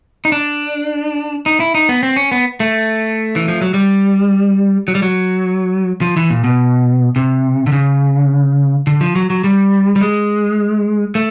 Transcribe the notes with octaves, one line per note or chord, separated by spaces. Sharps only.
D#4
D4
D#4
E4
D#4
B3
C4
C#4
B3
A3
E3
F3
F#3
G3
F#3
G3
F#3
F3
E3
A#2
B2
C3
D3
C#3
D3
F3
F#3
F#3
G3
G3
G#3
A3